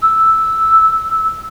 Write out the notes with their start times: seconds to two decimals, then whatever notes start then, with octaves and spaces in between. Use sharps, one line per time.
0.02 E6